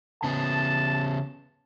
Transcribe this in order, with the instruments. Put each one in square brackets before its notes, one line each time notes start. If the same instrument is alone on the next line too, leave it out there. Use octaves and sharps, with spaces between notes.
[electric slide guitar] C#3 B3 [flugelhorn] A5